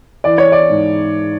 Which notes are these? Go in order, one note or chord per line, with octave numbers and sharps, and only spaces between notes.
E3 D5
C#5
D5
G#2